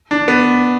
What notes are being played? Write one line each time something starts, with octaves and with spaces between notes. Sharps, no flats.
D4
B3